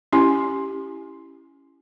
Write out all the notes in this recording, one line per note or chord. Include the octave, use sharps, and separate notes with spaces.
C#4 E4 G4 G#5 C6